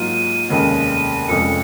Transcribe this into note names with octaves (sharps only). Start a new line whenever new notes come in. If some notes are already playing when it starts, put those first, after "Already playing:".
Already playing: G#2 F#3 A#3 F4 D#7
F1 D#2 C#3 G#3
D#7
F1 F2 C#3 G#3 C#7